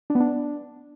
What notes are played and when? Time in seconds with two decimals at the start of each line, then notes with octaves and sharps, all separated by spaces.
0.10 D4
0.15 B3
0.20 D4